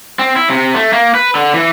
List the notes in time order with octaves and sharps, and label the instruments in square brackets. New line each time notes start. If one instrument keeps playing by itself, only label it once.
[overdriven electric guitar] C4
E4
C3
A3
A#3
B4
D3
E3